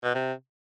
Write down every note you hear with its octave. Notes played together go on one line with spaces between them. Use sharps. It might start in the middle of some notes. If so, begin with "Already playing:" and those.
B2
C3